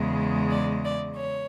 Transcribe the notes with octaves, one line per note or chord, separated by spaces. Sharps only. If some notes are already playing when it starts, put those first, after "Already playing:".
Already playing: E2 C#3 G#3
D5
D5
C#5